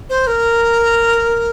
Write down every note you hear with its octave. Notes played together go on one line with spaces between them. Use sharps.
C5
A#4